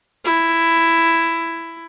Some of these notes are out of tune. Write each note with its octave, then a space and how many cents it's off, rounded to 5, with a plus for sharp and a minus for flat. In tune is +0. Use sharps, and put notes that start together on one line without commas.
E4 +10